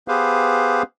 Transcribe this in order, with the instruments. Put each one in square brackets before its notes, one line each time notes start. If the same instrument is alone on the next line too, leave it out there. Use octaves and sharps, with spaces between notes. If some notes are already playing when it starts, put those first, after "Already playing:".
[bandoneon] B3 G4 G#4 B4 C5 F5